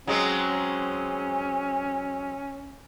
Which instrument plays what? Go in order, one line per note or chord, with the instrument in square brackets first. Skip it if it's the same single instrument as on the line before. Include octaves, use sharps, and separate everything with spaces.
[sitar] F#3 G#3 C4 [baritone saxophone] C#4